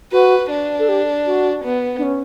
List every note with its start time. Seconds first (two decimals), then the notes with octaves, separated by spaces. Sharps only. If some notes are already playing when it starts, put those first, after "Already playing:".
0.12 F#4 B4
0.50 D4
0.79 A4
0.88 G4
1.26 F#4
1.64 B3
1.98 D4
2.03 C#4